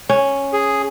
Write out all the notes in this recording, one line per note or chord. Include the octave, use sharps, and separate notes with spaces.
C#4
G#4